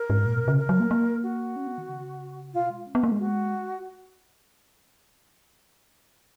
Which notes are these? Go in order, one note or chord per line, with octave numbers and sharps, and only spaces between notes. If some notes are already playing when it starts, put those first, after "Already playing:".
Already playing: A#4
G#2
A#2
B2
C#3
A#4
F#3
A#3
A#3
F#4
C#4
B3
D#3
C#3
B2 F4
G#3
C#4
B3
A#3
G#3
F#4